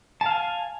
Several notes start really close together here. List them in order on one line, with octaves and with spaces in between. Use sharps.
A5 F5 G#5